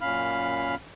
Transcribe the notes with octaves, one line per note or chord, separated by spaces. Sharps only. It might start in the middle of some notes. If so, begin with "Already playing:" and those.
F#2 A#2 C#4 F5 B5 F6